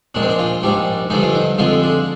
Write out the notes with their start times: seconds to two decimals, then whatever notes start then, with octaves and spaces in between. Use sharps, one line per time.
0.15 A#1 A#2 G#3 D4
0.22 C4
0.29 D4
0.39 F4
0.63 A#1 G#2 G3 D4
1.10 G2 D3 F3 G#3 D#4
1.23 F4
1.35 D#4
1.58 F2 D3 F3 G#3 F4
1.83 D4